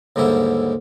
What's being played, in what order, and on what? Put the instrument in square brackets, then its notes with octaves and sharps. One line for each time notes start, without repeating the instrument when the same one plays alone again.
[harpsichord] D#2 G#2 D3 G3 E4